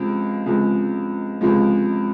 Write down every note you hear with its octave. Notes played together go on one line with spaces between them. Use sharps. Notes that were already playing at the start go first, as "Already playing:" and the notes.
Already playing: C#2 C3 F3 G#3
C#2 C3 F3 G#3
C#2 C3 F3 G#3